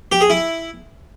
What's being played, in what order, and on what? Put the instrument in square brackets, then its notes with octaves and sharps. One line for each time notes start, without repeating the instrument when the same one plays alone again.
[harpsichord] G4
G#4
E4